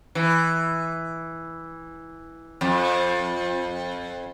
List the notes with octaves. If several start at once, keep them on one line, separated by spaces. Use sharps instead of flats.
E3
F2